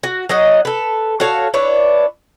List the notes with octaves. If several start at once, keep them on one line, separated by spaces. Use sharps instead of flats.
F#4
F#3 D#4 D#5 F#5
A4 B4
F#4 A4 C#5 F5
D4 E4 B4 C#5